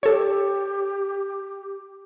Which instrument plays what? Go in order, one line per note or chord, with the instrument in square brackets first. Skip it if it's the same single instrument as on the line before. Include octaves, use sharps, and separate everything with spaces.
[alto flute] G4 [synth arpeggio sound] A4 C#5